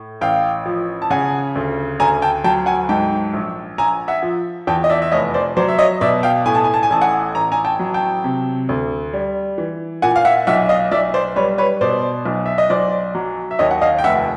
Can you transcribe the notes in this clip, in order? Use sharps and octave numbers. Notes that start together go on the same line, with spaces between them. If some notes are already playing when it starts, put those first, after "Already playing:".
Already playing: A2
A1 F5 G5
F3
A5
C#3 F#5 G#5
D2
D2 G#5 A#5
G5 A5
F#3 G5 A5
F#5 G#5
G#2 G5 A5
A#1
A#1 G#5 A#5
E5 F#5
F3
E2 G5 A5
D#5
D5 E5
E5
F1 C#5 D#5
C5 D5
F#3 C5 D5
E5
C#5 D#5
B2 D5 E5
F5 G5
A2 G#5
A5
G#5
A5
G#5
A1 A5
F#5 G#5
A1 A#5
G#5 A#5
G5 A5
F#3
G5 A5
C3
D2
G3
E3
A#2 F#5 G#5
F5
E5 F#5
B1 E5 F#5
D#5 F5
B1 D5 E5
C5 D5
G3 B4 C#5
B4 C#5
B2 C5 D5
B1
E5
D#5
B1 C5 D5
F#3
E5
D#2 C#5 D#5
F#5
D#5 F5
G5
F1 E5 F#5